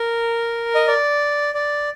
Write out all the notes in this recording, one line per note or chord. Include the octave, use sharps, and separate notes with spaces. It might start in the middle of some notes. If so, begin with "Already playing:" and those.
Already playing: A#4
D#5
D5
D5